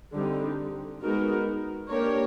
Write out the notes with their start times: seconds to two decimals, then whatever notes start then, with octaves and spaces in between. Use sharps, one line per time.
0.14 D3 G3 C4 D#4
1.01 G#3 B3 D#4 F#4 A#4
1.88 A#3 D4 G4 A#4 C#5